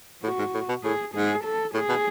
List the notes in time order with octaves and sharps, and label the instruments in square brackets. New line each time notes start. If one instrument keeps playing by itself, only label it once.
[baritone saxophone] A2 [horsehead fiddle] F#4
[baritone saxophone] G#2
A2
B2
[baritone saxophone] A2 [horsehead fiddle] G#4
[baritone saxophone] G#2 [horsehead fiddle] G#4
[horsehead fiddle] A4
[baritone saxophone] A2 [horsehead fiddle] G#4
[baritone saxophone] B2